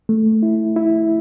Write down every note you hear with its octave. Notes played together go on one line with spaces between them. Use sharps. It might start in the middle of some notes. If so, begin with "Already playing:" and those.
A3
E4
E4